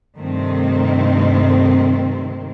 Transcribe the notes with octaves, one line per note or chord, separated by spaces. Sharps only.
G2 C3 D#3 A3 C4